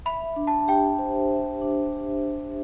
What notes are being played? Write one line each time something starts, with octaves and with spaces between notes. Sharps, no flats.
E5 B5
D4
A5
G4 G5
C5
E5
D4
G4
C5